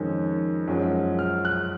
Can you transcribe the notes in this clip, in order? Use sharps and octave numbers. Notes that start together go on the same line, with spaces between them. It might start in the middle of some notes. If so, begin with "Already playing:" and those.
Already playing: F2 D#3 G#3 C#4
F#2 F3 G#3 C#4
F6
F#6